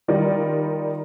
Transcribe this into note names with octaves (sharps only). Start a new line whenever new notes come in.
D#3 G3 D#4 F4 A#4 D5